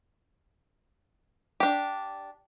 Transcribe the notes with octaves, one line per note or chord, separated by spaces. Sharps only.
D4 G4